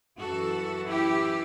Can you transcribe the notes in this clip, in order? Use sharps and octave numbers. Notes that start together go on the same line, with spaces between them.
F#2 E3 F#4 A4
E4 G4